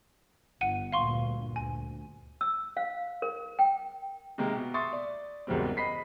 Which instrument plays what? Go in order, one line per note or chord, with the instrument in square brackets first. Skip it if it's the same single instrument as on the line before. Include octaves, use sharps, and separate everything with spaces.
[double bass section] G1 [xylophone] F#5 D#7
[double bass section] D2 G2 A#2 [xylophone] F5 C6 C#6
[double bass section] D2 [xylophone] G#5
[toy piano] E6
F5
A#4
G5
[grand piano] C3 D#3 G#3 A#3
B2
E5 C6 C#6 D#6 A6
D5
F#1 E2 G#2 F#3 G3 C4
D#5 B5 B6 C7